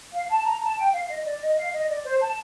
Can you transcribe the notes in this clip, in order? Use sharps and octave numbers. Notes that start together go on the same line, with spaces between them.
F5
A5
A#5
A5
G5
F5
D#5
D5
D#5
F5
D#5
D5
C5
A5